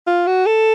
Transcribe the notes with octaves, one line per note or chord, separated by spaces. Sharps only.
F4
F#4
A4